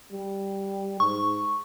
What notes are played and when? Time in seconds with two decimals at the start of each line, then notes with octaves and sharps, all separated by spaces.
0.12 G3
1.00 G#2 C#6